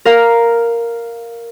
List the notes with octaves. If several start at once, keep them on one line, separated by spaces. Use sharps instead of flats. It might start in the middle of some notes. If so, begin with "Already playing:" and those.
A#4 F5